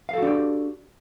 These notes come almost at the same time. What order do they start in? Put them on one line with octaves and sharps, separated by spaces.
F5 A4 F#4 D4 G4